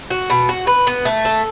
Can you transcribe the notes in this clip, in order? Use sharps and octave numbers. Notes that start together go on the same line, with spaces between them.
F#4
B2
F#4
B4
B3
A3
A4